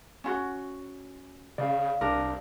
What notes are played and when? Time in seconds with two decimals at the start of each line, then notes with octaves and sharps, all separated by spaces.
0.24 C#4 F4 F#4
1.58 C#3 D5 F5
2.01 C2 D4 A#4